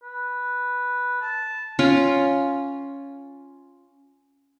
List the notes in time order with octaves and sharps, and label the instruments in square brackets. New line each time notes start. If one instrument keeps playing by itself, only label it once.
[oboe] B4
A5
[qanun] C#4 F4